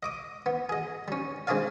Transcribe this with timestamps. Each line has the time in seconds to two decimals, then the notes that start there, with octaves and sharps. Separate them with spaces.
0.03 D#5 D6 D#6
0.46 B3
0.69 G#4 D#5
1.08 G3 C#4
1.47 G#3 C4 D4 G#4 D5 F5